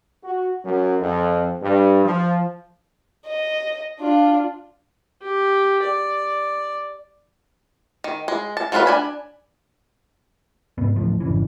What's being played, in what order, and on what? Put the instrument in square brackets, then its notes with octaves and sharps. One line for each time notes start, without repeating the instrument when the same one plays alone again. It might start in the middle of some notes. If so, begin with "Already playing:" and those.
[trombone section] F#4
F#2
F2
G2
F3
[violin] D#5
D4 F4
[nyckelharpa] G4
D5
[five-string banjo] D#3
G#3
A5
F#3 C4 F4 A4 B4
D4 G#5 B5
[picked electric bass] G#2 C3 B3
D1 A1 A2 F3
G#1 F2 C#3 E3